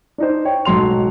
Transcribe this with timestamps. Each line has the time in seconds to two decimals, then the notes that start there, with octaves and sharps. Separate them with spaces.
0.18 D4 D#4 C5
0.45 C#5 G5
0.65 B1 G#2 F#3 C6 F7